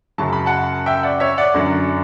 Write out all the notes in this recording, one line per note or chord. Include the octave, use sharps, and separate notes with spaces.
F#2 C#3 F#3 A5
B5
F#5 A5
E5 G5
D5 F#5
C#5 E5
D5 F#5
F#2 D3 F#3